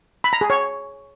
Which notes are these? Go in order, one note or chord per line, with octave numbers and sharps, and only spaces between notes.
B5
A#5
G#4
C#5